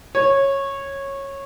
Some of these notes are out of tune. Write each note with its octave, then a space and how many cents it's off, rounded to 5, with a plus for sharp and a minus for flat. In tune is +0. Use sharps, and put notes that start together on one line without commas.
C#5 -15